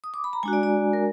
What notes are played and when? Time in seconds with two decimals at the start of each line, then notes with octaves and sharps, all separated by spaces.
0.04 D#6
0.14 D6
0.24 B5
0.33 A#5
0.43 G#3 D4 F#4 G#5
0.53 D5
0.63 D5
0.93 A#4